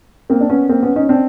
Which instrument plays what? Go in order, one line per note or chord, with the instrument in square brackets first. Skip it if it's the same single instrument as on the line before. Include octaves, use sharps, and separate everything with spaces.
[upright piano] A#3 C4
D4
B3 C#4
A#3 C4
B3 C#4
C#4 D#4
C4 D4